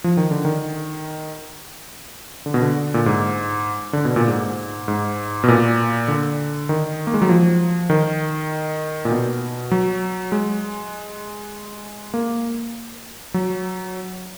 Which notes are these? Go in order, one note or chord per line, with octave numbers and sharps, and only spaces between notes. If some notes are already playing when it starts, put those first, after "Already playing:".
F3
D#3
D3
D#3
D3
B2
D3
A#2
G#2
D3
B2
A#2
G#2
G#2
B2
A#2
D3
D#3
A#3
G#3
F#3
F3
D#3
A#2
B2
F#3
G#3
A#3
F#3